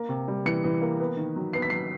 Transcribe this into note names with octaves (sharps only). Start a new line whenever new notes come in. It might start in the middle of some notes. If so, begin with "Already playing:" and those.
Already playing: A#3
C3
G3
E3 C#7
E3
A#3
B3
D#3
F#3
B3 C7
B6
F#3 C7